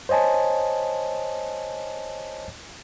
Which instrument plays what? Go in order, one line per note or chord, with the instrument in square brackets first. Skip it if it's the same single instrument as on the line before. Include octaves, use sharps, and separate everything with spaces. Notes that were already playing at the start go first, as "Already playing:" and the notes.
[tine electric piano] C5 C#5 D#5 G#5 A5